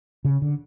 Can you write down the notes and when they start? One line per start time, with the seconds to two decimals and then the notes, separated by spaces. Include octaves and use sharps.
0.25 C#3
0.42 D3